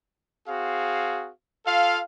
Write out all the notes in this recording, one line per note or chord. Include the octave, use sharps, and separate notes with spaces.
C4 F#4 G#4 F5
F4 A4 F5